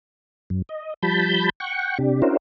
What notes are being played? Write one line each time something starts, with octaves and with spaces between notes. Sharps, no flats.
F#2
D#5
F3 G3 A5 B5 G6
F#5 G5 C#6
C3 D4 G4
C#4 D4 E4 F#4 A#4 C5